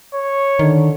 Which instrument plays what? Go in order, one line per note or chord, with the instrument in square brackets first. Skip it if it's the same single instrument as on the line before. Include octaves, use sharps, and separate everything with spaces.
[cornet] C#5
[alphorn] D3 [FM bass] D#3